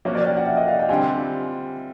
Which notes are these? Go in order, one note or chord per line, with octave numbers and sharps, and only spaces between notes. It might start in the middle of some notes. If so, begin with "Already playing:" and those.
F3 A#3 C#4 F#4 C#5
D5
G5
F#5
E5
D#5
F5
G5
D3 G3 C4 F4 G#5